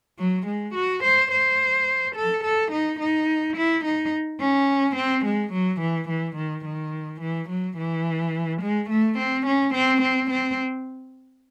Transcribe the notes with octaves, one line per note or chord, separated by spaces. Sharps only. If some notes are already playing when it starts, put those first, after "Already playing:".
F#3
G#3
F#4
C5
C5
A4
A4
D#4
D#4
E4
D#4
C#4
C4
G#3
F#3
E3
E3
D#3
D#3
E3
F#3
E3
G#3
A3
C4
C#4
C4
C4
C4